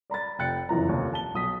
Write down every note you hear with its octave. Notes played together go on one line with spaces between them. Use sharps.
D5 A#5 B5 A6
F1 G5 F#6 A6 C#7
F#1 F2 E3 A#5
F1 D#2
A5 G7
B1 D#6 B6